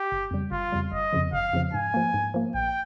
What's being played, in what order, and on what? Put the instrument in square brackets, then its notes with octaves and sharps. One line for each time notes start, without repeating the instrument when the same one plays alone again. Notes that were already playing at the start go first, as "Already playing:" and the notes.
Already playing: [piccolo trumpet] G4
[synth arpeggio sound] G1
F2 C#3 G3
[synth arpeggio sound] G1 [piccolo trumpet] F4
[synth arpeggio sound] F2 C#3 G3
[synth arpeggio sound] G1 [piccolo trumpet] D#5
[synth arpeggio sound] F2 C#3 F3
[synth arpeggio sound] G1 [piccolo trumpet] F5
[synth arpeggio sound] F2 C#3 F3
[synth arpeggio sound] G#2 [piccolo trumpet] G#5
[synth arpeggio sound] F3 A#3
G#2
F3 A#3
[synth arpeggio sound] A#1 [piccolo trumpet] G5